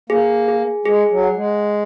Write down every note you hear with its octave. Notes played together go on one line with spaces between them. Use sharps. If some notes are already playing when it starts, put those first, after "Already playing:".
A#3 G#4
G#4
G#3 G#4
F#3
F#5
G#3